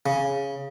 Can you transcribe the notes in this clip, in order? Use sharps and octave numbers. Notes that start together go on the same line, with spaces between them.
C#3